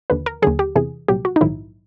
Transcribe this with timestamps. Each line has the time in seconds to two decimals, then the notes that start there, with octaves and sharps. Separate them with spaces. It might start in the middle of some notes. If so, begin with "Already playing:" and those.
0.10 D#2 D3 F3 B4
0.26 A#4
0.42 D#2 D3 F#3 G#4
0.59 G4
0.75 E2 C3 E3 G#4
1.09 C2 A#2 F#3 G4
1.25 F#4
1.36 D#4
1.41 A#1 G#2 D#3 F#3 E4